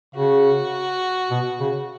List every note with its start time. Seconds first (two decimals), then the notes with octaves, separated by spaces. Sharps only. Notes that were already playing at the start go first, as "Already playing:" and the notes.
0.15 C#3 F#4
1.30 B2
1.60 C#3